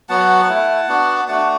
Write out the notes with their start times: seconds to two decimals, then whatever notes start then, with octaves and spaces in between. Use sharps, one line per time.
0.09 F#3 B3 F#4 F#5 A5
0.49 A3 E4
0.88 B3 D4 F#4
1.28 A3 D4 F#4 F#5 A5